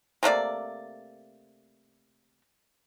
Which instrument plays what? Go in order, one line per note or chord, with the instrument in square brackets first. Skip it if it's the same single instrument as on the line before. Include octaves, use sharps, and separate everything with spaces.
[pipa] C3 A3 A#3 D5